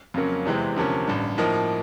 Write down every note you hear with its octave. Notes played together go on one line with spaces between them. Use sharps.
F2 C#3 F#3 A#3 C#4
E2 C3 E3 G#3 C4
D2 C3 F3 A#3 C#4
A1 G2 D3
A2 F3 A#3 D#4